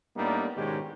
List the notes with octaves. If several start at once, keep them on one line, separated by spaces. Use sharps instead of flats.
A2 G3 A#3 B3 D4 D#4
G#2 B2 D#3 G#3 C#4 G4